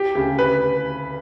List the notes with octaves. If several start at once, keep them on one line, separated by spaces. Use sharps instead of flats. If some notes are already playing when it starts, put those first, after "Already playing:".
Already playing: G4
D2 C#3 G4
B4